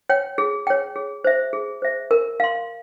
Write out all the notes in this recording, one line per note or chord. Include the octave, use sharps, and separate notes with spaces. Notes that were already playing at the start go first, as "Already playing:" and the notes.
C#5 G5
G#4
C#5 G5
G#4
C5 E5
G#4
C5 E5
A#4
F5 C6